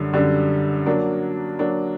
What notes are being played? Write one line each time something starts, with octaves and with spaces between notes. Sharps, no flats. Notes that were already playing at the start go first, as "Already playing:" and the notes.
Already playing: F#2 D3 G3
F#2 D3 G3
F#3 A#3 D4
F#3 A#3 D4